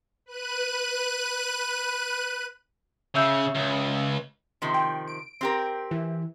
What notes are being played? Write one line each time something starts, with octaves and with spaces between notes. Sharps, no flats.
B4 F#6 D#7
C#3 E5 E6 G6
C#2
C3 D#3 F3
G5
D7
C4 G4 A#4
E3